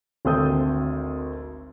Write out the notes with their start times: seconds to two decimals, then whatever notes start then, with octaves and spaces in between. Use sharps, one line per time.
0.25 G#1 D2 C4 A4 D#6 G6